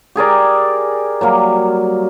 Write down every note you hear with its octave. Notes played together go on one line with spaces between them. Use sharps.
G4 G#4 A#4 D5
F#3 G3 A#3